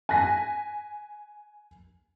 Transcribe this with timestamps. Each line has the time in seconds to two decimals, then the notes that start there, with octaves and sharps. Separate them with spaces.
0.09 G#5 F#6 A#6 B6